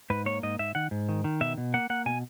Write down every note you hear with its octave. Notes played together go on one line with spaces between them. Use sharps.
G#2 B4
A#3 C#5
G#2 D#5
G#2 E5
D#3 F#5
G#2
D#3
D#3
B2 E5
B2
A#3 F#5
A#3 F#5
B2 G#5